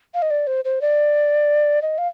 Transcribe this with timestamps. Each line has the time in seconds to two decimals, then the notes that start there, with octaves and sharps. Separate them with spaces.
0.14 F5
0.22 D#5
0.30 D5
0.47 C5
0.64 C5
0.81 D5
1.82 D#5
1.98 F5